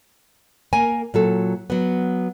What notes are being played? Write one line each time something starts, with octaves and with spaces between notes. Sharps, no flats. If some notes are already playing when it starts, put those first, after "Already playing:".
A#3 A#4 G#5
A#2 F#3 A4
F#3 B3